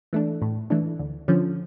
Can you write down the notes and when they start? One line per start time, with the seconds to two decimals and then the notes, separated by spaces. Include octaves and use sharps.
0.13 E3 A3 D4
0.42 A2
0.70 E3 A3 D4
0.99 D2
1.28 D3 F3 C#4